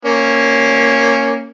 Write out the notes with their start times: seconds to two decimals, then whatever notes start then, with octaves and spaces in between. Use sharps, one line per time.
0.05 A#3 C#4